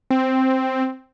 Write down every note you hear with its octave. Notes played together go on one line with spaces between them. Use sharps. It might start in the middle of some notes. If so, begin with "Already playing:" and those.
C4